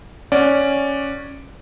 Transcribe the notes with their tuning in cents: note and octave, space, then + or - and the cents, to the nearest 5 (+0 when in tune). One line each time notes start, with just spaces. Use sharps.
C#4 +0 D5 +0 F#5 +0